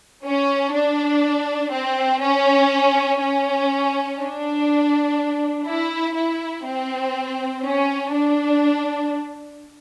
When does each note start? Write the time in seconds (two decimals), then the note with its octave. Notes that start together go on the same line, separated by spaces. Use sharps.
0.25 C#4
0.74 D4
1.73 C4
2.22 C#4
3.20 C#4
4.19 D4
5.67 E4
6.16 E4
6.66 C4
7.64 C#4
8.13 D4